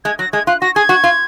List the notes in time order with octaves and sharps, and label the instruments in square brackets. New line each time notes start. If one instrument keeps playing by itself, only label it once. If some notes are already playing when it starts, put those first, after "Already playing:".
[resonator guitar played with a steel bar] G#3 [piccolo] G#6
[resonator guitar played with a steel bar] F#3 [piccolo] A#6
[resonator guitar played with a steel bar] G#3 [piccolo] G#6
[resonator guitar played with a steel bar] F4 [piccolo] F#6
[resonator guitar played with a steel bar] F#4 [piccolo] A#6
[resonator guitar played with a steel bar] G#4 [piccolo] G#6
[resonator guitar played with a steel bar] F#4
F4